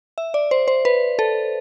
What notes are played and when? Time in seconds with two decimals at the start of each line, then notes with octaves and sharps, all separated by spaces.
0.18 E5
0.34 D5
0.51 C5
0.68 C5
0.85 B4
1.19 A4